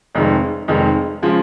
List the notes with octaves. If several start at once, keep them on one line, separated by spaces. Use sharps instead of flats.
F1 F2 D#3 G#3
F1 F2 D#3 G#3
C#3 F3 G#3